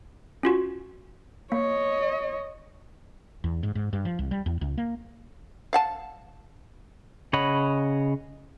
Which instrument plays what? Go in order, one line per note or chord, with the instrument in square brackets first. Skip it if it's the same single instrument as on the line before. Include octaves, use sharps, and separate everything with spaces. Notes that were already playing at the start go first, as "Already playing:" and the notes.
[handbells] C#4 F4 F#4
[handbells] A#3 [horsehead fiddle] C#5 D#5
[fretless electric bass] E2
G#2
G#2
G2
F3
C2
G3
E2
C#2
A#3
[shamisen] F5 F#5 A5
[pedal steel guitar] C#3 C#5 D#5 F#5 B5